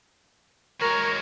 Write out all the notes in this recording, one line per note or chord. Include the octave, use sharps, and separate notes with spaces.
G#3 F#4 A#4 C#5